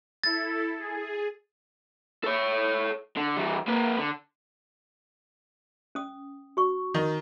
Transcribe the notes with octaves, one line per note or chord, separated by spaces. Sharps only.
E4 A4 A6
G#4
A4 C#5
D3
E3 G3
A#3 B4
D3
C#4 D#6
F#4 C#6
D#3 D#4